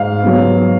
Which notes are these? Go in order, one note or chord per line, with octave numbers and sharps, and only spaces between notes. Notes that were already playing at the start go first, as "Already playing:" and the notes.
Already playing: G#2 F5
F#3 B3